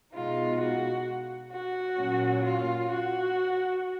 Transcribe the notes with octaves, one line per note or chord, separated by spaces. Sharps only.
B2 G#3 D#4 F4
F#4
F#4
A#2 F#3 C#4
F4
F#4